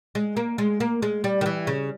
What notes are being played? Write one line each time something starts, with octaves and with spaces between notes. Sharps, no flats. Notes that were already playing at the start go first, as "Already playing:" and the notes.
G#3
A#3
G#3
A#3
G#3
G3
D#3
E3
C#3